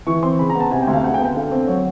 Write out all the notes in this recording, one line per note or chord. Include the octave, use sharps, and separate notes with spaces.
E3 C#6
C4 C6
C#3 B5
A#5
B3 A5
C3 G#5
G5
D2
F5
C#3 F#5
G5
B3
G5
D3 F5
C4
F#3 C#5